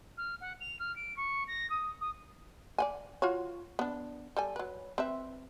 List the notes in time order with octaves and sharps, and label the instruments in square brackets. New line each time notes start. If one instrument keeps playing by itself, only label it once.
[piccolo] F6
F#5
F7
F6
D7
C#6
A#6
D#6
D#6
[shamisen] D5 F#5 G#5
F4 F#4 C#5
B3 D4
G3 A4 G#5
F#3 B4
C4 B4 E5